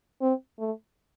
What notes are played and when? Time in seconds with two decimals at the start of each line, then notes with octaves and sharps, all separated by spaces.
0.21 C4
0.60 A3